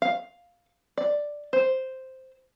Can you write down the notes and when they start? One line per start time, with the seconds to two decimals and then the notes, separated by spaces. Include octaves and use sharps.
0.02 F5
0.97 D5
1.53 C5